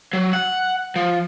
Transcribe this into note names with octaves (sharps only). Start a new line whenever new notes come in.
F#3
F#5
F3